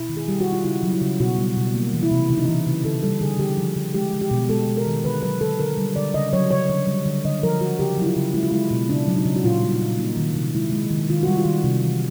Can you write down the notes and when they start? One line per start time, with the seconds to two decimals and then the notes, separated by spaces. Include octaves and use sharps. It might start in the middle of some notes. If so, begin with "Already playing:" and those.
Already playing: B2 E4
0.09 D#3
0.17 G#4
0.28 G3 G4
0.40 F#4
0.46 D#3
0.53 F4
0.64 C#3 E4
0.83 F#3
0.92 E4
1.02 C#3
1.20 B2 F#4
1.38 G3
1.57 B2
1.75 A#3
1.93 E3
2.03 E4
2.12 C3
2.30 C#3 E4
2.37 D#4
2.46 E3 E4
2.67 C#3
2.85 D3 A4
3.03 G3 A4
3.21 D3 G#4
3.39 D3 G4
3.57 F3
3.76 D3
3.95 G#3 G4
4.13 G#3
4.22 G4
4.31 B2
4.49 G#3 A4
4.68 G#3
4.77 A#4
4.86 D#3
5.05 D3 B4
5.23 F#3 B4
5.41 D3 A4
5.60 D3 A#4
5.78 G3
5.96 D3 D5
6.14 C#3 D#5
6.33 F#3 C#5
6.51 C#3 C#5
6.69 D3
6.87 G3
7.06 D3
7.25 D3 D#5
7.43 F3 A#4
7.60 D3 F#4
7.79 C#3 G4
7.97 F#3 E4
8.07 F4
8.16 C#3
8.34 G#3 E4
8.43 F4
8.52 G#3 E4
8.71 B2
8.89 C#3 D4
9.08 F#3
9.16 D#4
9.26 C#3
9.36 F#4
9.44 A#2 F4
9.63 G3
9.72 D#4
9.82 A#2
9.99 A#3 D#4
10.17 D#3
10.35 C3
10.54 G#3 E4
10.72 G#3
10.90 D#3
11.09 D#3 F4
11.23 F#4
11.28 G3
11.37 F4
11.45 D#3
11.64 C3
11.83 E3